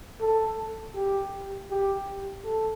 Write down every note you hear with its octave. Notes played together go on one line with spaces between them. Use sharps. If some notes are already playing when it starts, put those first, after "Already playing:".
A4
G4
G4
A4